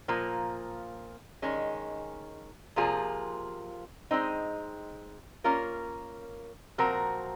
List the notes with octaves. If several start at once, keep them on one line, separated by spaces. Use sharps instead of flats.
A#2 F3 A#3
D#3 G#3 C#4
C3 F3 A#3 F4 G#4
G#3 C4 D#4
A#3 C#4 F4 A#4
A#2 F3 C4 F#4 A#4